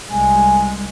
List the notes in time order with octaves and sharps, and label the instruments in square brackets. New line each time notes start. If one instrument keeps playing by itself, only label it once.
[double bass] C2 G#3 [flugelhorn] G#5